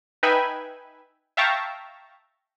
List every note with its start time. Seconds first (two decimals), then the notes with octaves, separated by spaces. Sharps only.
0.23 D#4 B4 E5 G5 G#5 B5
1.37 E5 F5 G5 A5 A#5 C#6